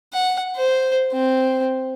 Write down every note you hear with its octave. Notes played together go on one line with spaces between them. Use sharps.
F#5
C5
C4